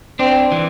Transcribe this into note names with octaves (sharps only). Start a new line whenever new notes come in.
C4 D4
E3